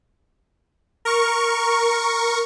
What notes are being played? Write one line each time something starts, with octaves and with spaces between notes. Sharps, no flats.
A#4 C#6